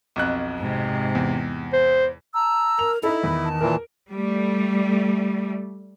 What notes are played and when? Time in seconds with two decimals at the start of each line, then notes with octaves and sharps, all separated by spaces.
0.16 B1 F2 F#6
0.59 G#2 C3
1.15 E2
1.73 C5
2.35 A5 A#5 E6
2.79 A#4 F7
3.03 D#4 E4 A4 D#5 B5
3.23 E2 D#3
3.44 A5
3.61 A#2 E3 A#4
4.10 G3 A3